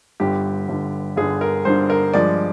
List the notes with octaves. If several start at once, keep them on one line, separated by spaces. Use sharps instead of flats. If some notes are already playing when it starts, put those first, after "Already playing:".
G1 G2 D3 G4
G1 G2 D3
G1 G2 D3 G#4
A#4
G1 G2 D3 C5
A#4
G2 F3 G#3 D5